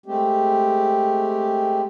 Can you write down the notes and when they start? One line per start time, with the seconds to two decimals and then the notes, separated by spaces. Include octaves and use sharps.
0.06 G#3 A3 C4 G4